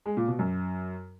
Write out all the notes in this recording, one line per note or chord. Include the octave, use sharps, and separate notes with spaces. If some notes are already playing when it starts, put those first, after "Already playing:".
G#3
A#2
B2
F#2